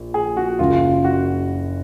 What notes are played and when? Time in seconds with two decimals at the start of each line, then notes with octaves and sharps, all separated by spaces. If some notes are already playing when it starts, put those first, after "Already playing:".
Already playing: A#1
0.14 G#4
0.37 F#4
0.59 F#1 F#2 C#3 F4
1.04 F#4